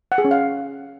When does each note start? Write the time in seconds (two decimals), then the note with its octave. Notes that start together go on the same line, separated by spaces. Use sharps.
0.12 F#5
0.18 G#4
0.25 C#4
0.31 F5